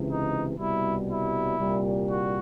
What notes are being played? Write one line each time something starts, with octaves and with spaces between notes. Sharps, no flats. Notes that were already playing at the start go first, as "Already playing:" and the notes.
Already playing: C#2 C3 E3
D#4
C2 B2 G3 E4
E4
C2 A#2 G3
F#4